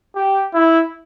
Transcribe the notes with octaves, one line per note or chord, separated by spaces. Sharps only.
G4
E4